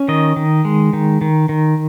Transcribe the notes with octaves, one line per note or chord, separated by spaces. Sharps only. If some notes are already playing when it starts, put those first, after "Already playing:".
Already playing: C#4
D#3 D#5
D#3
G#3
D#3
D#3
D#3